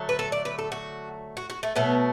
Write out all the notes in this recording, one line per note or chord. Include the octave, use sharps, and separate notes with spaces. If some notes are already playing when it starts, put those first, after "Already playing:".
Already playing: D3 F#3 A3
B4
A4
D5
B4
A4
F#4
F#4
F#4
A3
B2 F#3 A3 B3